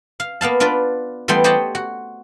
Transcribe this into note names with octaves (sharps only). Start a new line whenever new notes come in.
F5
A#3 B3 F5 A5
D4 F4 B4 D5
E3 G3 A3 B3 G5 C6
G4 C5 C#5 D#5 F#5 A5
F#4